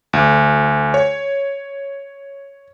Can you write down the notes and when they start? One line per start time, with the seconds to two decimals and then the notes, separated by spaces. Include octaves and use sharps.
0.13 D2
0.94 C#5